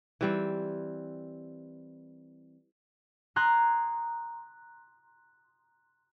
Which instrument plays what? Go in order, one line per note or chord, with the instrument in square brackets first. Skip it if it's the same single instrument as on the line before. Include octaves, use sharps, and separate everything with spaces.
[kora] E3 G3 C4
[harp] A#5 C6 D#6 F#6 G#6